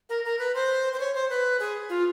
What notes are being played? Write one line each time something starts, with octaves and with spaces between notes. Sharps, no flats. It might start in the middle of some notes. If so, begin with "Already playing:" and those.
A#4
A#4
B4
C5
C5
C#5
C5
B4
G#4
F4